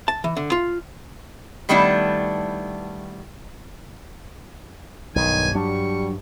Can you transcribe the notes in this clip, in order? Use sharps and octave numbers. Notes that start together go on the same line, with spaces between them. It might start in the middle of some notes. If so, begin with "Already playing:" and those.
A5
E3
D3
F4
D#3 G3 A3 B3 D4 E4
B1 G2 D#3 G#5
F#3 G3 D4 C#6